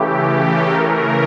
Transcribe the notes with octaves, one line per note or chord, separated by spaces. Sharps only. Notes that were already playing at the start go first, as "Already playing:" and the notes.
Already playing: C#3 E3 A3 G4
C#3 E3 A3 A#4